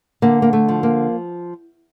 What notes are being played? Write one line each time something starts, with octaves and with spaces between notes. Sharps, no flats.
D3 A#3
A#3
A3
F3
A#3